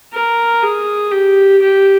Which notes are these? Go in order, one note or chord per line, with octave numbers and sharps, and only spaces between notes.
A#4
G#4
G4
G4